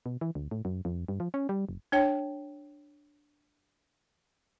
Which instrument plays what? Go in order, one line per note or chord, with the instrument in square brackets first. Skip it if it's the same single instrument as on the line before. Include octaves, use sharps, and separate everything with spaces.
[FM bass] B2
E3
D2
A2
F#2
F2
G2
F3
C#4
G3
F#1
[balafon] D4 C#5 G5